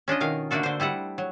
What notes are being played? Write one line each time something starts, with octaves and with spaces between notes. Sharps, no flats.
C#4 D4 F4 D#5
B2 D#3 A#4 F5
D3 A3 A#3 D4 F#4 A4
D3 C5
G3 E4 A4 F#5
F#3